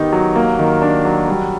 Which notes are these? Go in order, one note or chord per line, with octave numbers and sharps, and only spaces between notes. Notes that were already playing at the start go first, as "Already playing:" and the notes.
Already playing: D#3 B3 D#4 G4
F#3
A#3
D#3
D4
F#3
G3